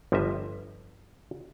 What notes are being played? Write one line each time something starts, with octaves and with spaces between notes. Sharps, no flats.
G1 F3 G3 D#5 E5